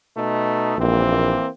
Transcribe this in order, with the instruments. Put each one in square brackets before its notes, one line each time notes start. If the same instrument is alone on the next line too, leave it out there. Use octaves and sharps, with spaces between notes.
[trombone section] B2 A3 D#4
[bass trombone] A#1 [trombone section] E3 A#3 C4